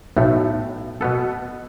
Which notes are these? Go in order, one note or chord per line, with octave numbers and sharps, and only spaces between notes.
B1 A2 A3
B2 B3 A4